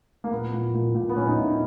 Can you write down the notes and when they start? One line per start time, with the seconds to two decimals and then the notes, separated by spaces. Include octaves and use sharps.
0.24 A#3
0.31 A#2 B3
0.53 A#2
0.74 A#2
0.95 A#2
1.09 B3
1.16 A#2 C#4
1.27 D#4
1.37 A#2 E4
1.48 D#4